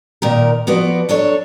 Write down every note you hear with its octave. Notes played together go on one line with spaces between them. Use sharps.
A#2 D#3 A#4
F3 B3 F#4 D5
F#3 D4 A4 C#5